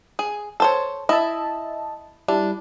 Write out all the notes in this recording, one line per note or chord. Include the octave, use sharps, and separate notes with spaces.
G#4
A4 C5 C#5
E4 D#5 E5 A5
G3 D4 E4